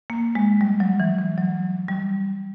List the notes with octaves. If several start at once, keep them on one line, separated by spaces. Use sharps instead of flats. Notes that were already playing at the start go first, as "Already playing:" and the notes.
A#3
G#3
G3
F#3
E3
E3
F#3
G3